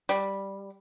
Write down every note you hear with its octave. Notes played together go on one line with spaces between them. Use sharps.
G3